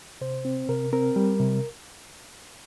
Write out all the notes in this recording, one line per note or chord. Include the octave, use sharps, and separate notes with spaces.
C3 C5
C4
C3 A#4
C4 A#4
G3
C3